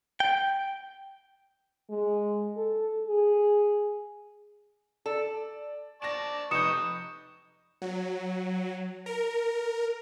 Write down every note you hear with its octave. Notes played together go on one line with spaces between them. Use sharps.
G5
G#3
A4
G#4
A4 D5
D5 A5 C#6 A#6 E7
F1 D#4 B4 C#6 D#6 G6 C#7 E7
F#3
A#4